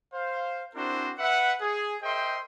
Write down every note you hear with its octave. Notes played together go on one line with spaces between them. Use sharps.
C5 F5
C4 D4 E4 F#4 A#4 C5
B4 E5 F#5
G#4
A#4 C5 D#5 E5 G5 C6